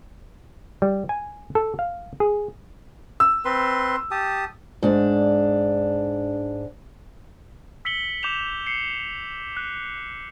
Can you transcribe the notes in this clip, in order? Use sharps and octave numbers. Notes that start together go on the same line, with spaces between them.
G3
G#5
A4
F5
G#4
E6
C4 B4 C6
G4 A5 D#6
G#2 D4
E6 B6 C#7 F#7 G7
D6 G6 E7 F7
C7 C#7
F#6